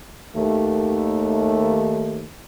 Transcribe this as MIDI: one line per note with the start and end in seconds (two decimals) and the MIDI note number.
0.35 2.27 39
0.35 2.27 57